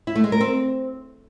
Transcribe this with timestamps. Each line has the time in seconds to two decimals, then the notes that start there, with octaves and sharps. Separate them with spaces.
0.07 E4
0.16 A3
0.24 G#3
0.32 A#4
0.41 C4